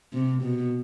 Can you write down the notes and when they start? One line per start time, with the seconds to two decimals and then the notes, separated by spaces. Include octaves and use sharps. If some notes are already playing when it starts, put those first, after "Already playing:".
0.13 C3
0.42 B2